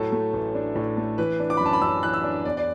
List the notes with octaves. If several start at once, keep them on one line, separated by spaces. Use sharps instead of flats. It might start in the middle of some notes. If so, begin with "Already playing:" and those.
Already playing: A2 F#3 A4
A3
A1
D4
A2
A3
E3 B4
D4
D6
B5
F#2
A5
B5
F#2 E6
E3 F#6
E6
D4
E2 D5
D5